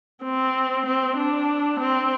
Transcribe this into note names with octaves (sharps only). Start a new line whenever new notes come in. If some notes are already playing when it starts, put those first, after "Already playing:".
C4
C4
D4
C4